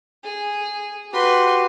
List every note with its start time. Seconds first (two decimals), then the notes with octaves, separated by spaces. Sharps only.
0.23 G#4
1.13 F#4 G4 B4 C6